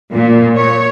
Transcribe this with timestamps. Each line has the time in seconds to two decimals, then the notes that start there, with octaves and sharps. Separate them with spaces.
0.13 A#2
0.56 C#5